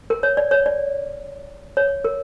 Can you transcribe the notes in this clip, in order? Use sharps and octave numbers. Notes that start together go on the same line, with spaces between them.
A#4
C#5
D5
C#5
D5
C#5
A#4